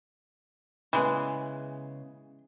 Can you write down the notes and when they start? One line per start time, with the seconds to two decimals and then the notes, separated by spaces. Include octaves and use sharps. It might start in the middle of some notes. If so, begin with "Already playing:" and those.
0.93 C#3 E3 G#3 B3